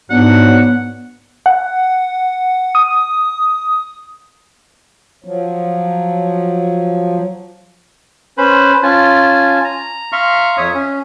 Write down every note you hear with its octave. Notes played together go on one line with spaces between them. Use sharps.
G#2 F#3 B3 D4 F#5
F#5
D#6
F3 F#3
C#4 B4 C5 B5
C#4 F4 G#5 A5
A#5
E5 F5 A#5 C6 C#6 F6
F2 C#5 E5 D#6
C#4